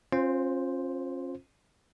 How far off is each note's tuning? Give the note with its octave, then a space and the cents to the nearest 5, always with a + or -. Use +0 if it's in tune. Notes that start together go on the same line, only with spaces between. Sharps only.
C#4 -40 F4 +15 C5 +0